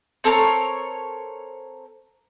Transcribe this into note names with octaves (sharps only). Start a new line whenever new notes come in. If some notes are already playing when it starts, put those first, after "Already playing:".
C4 A4 A#4 C#5